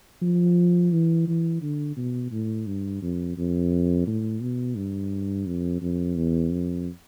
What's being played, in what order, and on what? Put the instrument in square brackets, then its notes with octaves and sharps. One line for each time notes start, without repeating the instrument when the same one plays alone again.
[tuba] F3
E3
E3
D3
B2
A2
G2
F2
F2
A2
B2
G2
F2
F2
E2
F2